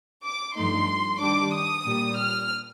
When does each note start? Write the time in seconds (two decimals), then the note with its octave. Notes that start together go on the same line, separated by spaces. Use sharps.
0.23 D6
0.54 G2 F3 A3 D#4 C6
1.20 D#3 G3 D4 D6
1.52 D#6
1.85 A#2 G3 A#3
2.17 F6